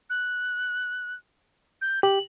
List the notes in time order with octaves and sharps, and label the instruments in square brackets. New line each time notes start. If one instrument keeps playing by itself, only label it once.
[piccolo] F#6
G6
[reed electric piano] G4 [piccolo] F#7